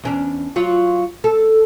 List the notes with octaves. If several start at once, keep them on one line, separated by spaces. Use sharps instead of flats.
E2 C#4 D4
F#3 F4
A4